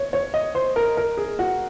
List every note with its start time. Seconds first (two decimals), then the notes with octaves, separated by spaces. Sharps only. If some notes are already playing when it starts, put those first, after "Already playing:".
Already playing: C#5
0.13 C#5
0.34 D#5
0.55 C5
0.76 A#4
0.97 A#4
1.17 G#4
1.39 F#4